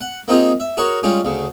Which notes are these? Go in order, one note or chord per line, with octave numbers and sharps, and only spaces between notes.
F#5
A#3 C4 D#4 F4 G4 G#4
E5
F#4 G#4 A#4 C#5
G3 G#3 C#4 F4 G4
D2 C#3